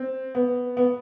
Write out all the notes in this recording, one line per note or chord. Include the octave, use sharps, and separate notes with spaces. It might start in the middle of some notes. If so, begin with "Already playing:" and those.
Already playing: C4
B3
B3